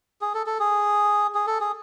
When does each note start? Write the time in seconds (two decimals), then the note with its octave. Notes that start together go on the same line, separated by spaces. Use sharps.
0.21 G#4
0.34 A4
0.46 A4
0.59 G#4
1.35 G#4
1.47 A4
1.60 G#4